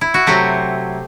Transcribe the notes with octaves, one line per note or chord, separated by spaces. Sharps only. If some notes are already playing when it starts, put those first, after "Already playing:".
E4
F#4
C3 F#3 A3 C4 G4